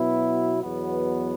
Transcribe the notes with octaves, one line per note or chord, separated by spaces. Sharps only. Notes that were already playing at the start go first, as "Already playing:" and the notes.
Already playing: B2 F#3 B3 E4
E2 B2 F#3 B3